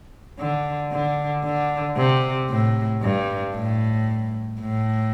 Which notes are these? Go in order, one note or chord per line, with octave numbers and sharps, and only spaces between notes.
D3
D3
D3
C3
A2
G2
A2
A2